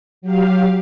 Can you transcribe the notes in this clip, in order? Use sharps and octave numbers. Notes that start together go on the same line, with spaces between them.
F#3 G4 F5